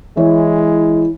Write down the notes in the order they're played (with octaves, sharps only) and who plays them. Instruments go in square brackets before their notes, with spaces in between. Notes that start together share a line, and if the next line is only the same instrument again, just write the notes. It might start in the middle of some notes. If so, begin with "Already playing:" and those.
[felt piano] E3 C#5 [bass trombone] G#3 [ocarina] E4